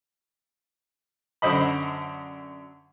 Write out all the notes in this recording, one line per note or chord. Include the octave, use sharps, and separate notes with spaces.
F#2 D3 C5 D#5 B5